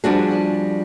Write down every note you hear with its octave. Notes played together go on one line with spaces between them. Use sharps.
F3 G3 C4 D4 F#4 G#4